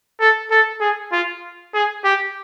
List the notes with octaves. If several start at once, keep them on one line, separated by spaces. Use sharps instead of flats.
A4
A4
G#4
F4
G#4
G4